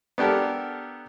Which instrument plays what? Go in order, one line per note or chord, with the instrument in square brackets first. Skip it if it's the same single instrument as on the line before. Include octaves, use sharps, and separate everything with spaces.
[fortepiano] B3 D4 G4 A4 A#4